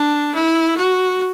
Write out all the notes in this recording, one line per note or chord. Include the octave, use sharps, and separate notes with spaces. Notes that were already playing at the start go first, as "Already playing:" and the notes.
Already playing: D4
E4
F#4